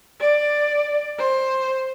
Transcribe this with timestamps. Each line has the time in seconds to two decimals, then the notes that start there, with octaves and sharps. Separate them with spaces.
0.21 D5
1.19 C5